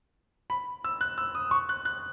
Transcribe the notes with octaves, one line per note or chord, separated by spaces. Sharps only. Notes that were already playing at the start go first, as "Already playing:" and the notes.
B5
E6
F#6
E6
D#6
C#6
F#6
F#6